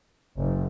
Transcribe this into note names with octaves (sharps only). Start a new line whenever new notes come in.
F#1